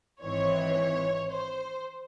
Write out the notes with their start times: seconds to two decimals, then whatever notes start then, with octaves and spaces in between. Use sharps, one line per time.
0.23 G#1 G#2 E3 C4 C#5
1.31 C5